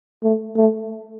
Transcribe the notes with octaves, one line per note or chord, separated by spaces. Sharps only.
A3
A3